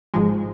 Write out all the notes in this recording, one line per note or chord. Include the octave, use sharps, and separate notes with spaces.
G#1 G#2 F3 G#3